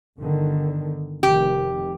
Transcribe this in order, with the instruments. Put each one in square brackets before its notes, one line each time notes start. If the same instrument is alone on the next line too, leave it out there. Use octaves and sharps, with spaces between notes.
[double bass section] G1 D3 D#3
[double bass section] F1 D#3 [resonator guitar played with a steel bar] G4